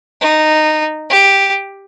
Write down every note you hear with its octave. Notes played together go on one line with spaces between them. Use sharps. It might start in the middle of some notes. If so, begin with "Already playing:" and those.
D#4
G4